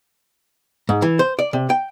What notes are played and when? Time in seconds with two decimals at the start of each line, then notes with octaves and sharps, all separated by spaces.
0.89 G#2
1.02 E3
1.19 C5
1.39 D5
1.53 C3
1.70 G5